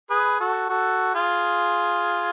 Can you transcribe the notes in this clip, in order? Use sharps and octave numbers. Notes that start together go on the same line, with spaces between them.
G#4 B4
F#4 A4
F#4 A4
F4 G#4